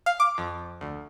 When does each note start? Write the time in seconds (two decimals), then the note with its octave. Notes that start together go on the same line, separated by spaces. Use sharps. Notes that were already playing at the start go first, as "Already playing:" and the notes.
0.06 F5
0.20 D6
0.38 F2
0.81 D2